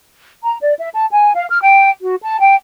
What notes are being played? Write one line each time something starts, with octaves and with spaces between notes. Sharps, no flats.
A#5
D5
E5
A5
G#5
F5
F6
G5
F#4
A5
G5